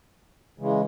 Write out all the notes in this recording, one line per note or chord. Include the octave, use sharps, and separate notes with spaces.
C#3 E3 G#3